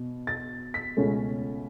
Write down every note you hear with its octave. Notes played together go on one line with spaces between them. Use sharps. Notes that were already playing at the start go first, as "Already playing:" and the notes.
Already playing: B2
A6
B6
C#2 B2 A3 C#4